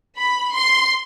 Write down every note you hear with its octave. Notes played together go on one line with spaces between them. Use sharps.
B5
C6